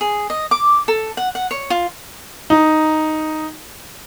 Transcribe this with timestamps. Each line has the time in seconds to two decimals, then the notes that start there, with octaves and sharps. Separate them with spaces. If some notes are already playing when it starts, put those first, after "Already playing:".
0.01 G#4
0.30 D#5
0.51 D6
0.88 A4
1.17 F#5
1.35 F#5
1.51 C#5
1.70 F4
2.50 D#4